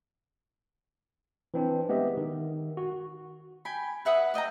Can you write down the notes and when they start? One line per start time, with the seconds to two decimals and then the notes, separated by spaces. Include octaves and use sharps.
1.54 E3 C4 D4
1.89 G#3 B3 G4 D#5 E5
2.17 D#3
2.77 F#4
3.65 G5 G#5 B5
4.05 B4 E5 F#5 D#6
4.34 D5 D#5 G5 A#5